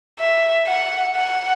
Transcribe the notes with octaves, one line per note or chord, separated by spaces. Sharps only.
E5
F#5
F#5